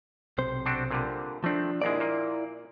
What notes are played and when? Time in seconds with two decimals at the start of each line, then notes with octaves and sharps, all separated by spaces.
0.38 B1 C3 C5
0.65 C4 D4 F#4
0.91 A#2 D3 G3
1.44 F3 A3 C4 D4
1.82 A#1 D#2 G#3 E4 D5
2.00 A#2 A#3